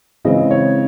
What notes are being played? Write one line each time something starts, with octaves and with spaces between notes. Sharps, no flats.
C#3 E3 G#3 C4 D#5
C#5